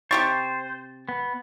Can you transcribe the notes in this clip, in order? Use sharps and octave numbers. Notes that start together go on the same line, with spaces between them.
C3 G4 C5 C#6 A6
B3